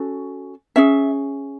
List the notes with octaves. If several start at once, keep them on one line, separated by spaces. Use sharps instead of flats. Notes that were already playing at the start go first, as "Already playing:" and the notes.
Already playing: C#4 F#4 A4
C#4 G#4 E5